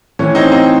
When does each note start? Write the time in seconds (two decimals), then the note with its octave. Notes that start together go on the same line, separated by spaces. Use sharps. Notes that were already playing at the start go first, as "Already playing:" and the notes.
0.19 A2 E3 C#4
0.35 C4 D#4
0.52 C4 D#4